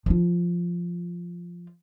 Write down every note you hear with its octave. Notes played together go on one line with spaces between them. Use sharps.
F3 F4